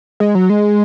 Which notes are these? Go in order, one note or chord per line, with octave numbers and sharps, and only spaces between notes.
G#3
F#3
G#3